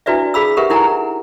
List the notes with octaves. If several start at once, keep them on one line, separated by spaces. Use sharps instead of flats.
D4 E4 F#4 B4 D5 E5
G#4 F5 B5 E6
G4 A#4 B4 E5 F#5
D#4 E4 A#4 F#5 G#5 A#5